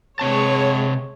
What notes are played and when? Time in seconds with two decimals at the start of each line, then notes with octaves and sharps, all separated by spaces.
0.19 C3 G#3 C4 C#5 A5